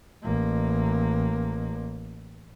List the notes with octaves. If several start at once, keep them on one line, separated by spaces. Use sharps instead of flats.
A1 A#3